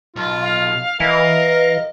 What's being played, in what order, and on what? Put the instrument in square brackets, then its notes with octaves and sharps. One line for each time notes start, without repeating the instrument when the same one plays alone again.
[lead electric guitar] B1 [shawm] F4
[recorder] F5
[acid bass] E3 [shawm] A#4 [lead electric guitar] D#5